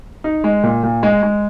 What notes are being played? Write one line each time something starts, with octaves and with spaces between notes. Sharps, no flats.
D#4
G#3
A#2
A#2
G#3
G#3